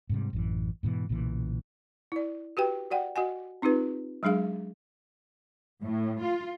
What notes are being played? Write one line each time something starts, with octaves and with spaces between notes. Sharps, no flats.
G#2 C3 G3
A1 F#2 E3
G#2 B2 D#3 E3
B1 A#2 C#3 E3
E4 D5
F#4 G4 B4 G5
F#4 D5 F#5 G5
F#4 D#5 F#5 G#5
C4 D#4 F4 G4 B4
F#3 G#3 D4 G#4 F5
A2
F4